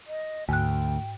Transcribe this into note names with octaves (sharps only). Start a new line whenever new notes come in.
D#5
D2 G#2 G5 F#6